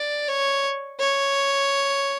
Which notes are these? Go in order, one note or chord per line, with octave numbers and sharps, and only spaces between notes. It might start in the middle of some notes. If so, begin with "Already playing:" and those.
Already playing: D5
C#5
C#5